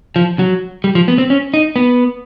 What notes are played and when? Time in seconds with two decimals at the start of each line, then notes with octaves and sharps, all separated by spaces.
0.16 F3
0.39 F#3
0.84 G3
0.95 F3
1.08 B3
1.18 C4
1.30 C#4
1.54 D#4
1.76 B3